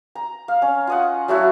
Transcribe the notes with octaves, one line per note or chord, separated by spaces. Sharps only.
A#5
F5
C#4
F4 D#5 F#5
F#3 A3 E4 F#4